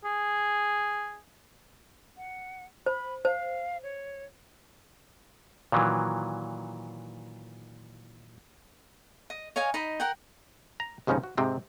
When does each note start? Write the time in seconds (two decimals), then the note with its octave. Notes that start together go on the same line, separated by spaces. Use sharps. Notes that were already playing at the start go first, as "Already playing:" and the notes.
0.05 G#4
2.17 F#5
2.86 C5 B5
3.25 C5 F5
3.83 C#5
5.72 A#2 D#3 E3 F#3
9.30 D#5
9.56 C#5 D#5 F5 G#5
9.74 D#4 D#5 B5
10.00 A#4 F#5 G5
10.80 A#5
11.07 D#2 G#2 C#3 F3 C#4 D#4
11.23 F#4
11.37 G#2 C3 C4 D#4